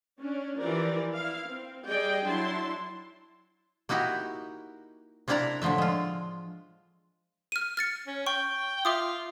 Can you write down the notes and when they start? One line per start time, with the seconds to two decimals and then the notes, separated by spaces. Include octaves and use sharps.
0.21 C#4 D4
0.59 E3 F3 G4 A#4 D5
1.15 E4 F5
1.47 C4
1.87 G3 G#4 D5 D#5 G5
2.26 F#3 D4 E4 A5 C6
3.89 A#3 D#4 E4 F#4 G4
5.28 C3 A#3 D4 E4 D5 A#5
5.62 A2 D3 F3 A3 E5
5.78 G#3 F4
7.52 F6 D#7
7.77 F6 A6 C#7
8.07 C#4
8.27 G5 C#6
8.85 F4 E5 D6 D#6